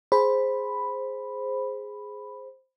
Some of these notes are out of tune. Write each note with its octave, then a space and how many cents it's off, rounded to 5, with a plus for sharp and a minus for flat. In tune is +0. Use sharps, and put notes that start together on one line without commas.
G#4 +0 C5 +0 B5 +0